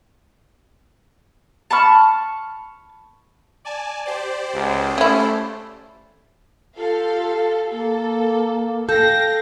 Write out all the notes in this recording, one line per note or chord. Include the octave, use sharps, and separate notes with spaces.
A5 B5 C#6 F6
D5 G#5 A5
G4 C5 D5
C#2
A3 C#4 E4
F4 G4 A4 F5
A#3 A4
A4 F5 G5 G6 A#6